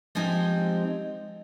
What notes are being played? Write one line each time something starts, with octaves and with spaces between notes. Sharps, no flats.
F3 G#3 C4 D#4 G4